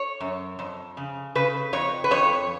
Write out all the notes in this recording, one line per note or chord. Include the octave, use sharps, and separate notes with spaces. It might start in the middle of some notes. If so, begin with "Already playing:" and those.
Already playing: C#5
F#2
F2
C#3
C#3 B4
F2 C#5
B4
F2 C#5